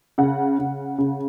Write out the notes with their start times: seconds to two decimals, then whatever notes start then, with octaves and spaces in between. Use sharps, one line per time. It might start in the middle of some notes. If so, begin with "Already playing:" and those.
0.18 C#3 F#5
0.59 C#3
0.98 C#3